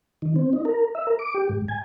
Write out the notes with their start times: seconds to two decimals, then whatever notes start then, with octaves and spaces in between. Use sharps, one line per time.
0.22 D#3
0.36 C4
0.53 D#4
0.65 A#4
0.95 E5
1.07 A#4
1.19 D6
1.34 G4
1.49 G#2
1.68 G#5